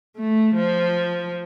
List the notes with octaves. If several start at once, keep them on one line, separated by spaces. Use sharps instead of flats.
A3
F3